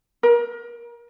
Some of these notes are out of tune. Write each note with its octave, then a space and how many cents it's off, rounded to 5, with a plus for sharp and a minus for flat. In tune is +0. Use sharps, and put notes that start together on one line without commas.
A#4 +30